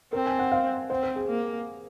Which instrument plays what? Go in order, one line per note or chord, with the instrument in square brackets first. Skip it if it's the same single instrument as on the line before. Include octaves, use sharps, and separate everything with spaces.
[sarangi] C4 [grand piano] A#4
[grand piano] G#5
F#5
F5
[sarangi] C4 [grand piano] C5
[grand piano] C5
G#4
[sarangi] A#3